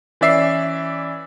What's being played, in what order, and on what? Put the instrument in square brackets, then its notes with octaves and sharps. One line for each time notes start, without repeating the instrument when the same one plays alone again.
[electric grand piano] E3 C#4 D5 E5 E6 C7